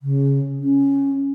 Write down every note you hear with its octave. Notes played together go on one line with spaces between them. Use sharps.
C#3
C#4